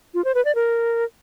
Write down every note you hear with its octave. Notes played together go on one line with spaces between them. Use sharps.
F4
C5
B4
D5
A#4